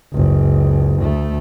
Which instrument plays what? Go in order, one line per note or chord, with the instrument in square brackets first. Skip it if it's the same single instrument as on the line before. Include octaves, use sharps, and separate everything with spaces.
[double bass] F#1 C#2
D2 A3